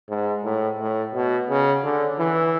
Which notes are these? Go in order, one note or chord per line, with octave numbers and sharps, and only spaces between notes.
G#2
A2
A2
B2
C#3
D3
E3